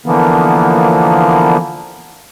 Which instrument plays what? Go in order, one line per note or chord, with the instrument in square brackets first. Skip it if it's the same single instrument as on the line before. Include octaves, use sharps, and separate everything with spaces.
[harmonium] D3 E3 F3 A#3 B3